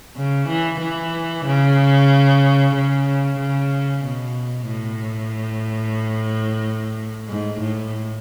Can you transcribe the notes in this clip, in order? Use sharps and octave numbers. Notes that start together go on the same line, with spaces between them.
C#3
E3
E3
C#3
C#3
C#3
B2
A2
G#2
A2